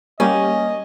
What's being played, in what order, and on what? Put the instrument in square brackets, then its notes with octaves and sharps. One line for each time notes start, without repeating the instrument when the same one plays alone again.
[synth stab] G3 A#3 G4 [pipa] C#4 [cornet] D#5